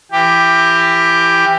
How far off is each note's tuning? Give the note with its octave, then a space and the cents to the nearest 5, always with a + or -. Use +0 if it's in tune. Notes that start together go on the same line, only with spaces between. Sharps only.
E3 +25 G4 +10